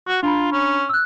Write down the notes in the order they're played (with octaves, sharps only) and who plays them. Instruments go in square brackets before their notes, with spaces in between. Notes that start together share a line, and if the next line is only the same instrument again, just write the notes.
[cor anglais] F#4
[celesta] D4 A#5 B5 [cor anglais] F4
[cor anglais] C#4
[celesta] E6 F#6